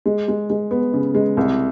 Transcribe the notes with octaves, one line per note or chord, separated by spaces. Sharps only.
G#3
G#3
G#3
B3
C#3
G#3
C2